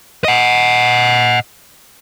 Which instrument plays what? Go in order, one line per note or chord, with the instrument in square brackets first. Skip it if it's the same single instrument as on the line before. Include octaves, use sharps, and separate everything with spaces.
[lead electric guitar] D#5 F#5